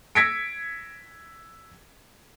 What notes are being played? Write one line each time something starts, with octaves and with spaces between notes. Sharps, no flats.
E6 G#6 A#6 B6 C#7 D7